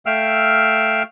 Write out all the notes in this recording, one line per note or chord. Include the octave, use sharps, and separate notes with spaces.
A3 E5 F5 G5 E6 F6